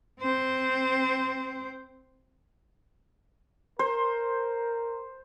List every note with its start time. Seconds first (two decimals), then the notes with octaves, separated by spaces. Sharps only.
0.20 C4 C5
3.79 A#4 C5